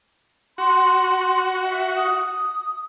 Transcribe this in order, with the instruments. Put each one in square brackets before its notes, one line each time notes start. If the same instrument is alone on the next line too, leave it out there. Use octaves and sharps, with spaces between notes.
[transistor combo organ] F#4 [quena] C6
[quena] E5
D#6